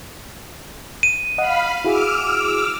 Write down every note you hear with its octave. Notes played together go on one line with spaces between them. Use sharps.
D#7
D#5 F5 F#5 B5
E4 F#4 G#4 D6 E6 F6